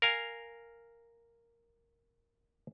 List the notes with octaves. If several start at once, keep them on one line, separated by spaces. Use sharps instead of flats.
A#4 F5 G#5